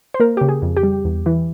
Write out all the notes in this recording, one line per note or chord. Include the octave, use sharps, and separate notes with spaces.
C5
A#3 A#4
C#3 G4
G#4
F2
G4
G3
E2
E3